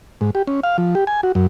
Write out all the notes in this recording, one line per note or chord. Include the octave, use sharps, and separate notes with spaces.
G#2
G4
C#4
F5
F3
G4
G#5
F#4
F#2